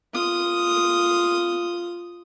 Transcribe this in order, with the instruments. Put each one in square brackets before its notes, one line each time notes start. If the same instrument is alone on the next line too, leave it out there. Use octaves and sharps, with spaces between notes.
[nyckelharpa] F4 D#6